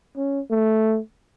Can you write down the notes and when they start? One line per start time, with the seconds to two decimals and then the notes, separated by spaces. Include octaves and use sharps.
0.17 C#4
0.51 A3